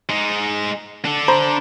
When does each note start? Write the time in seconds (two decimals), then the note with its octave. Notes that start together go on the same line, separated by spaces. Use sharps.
0.09 G#3 D#4
1.05 D4 A4
1.28 C5 A#5 B5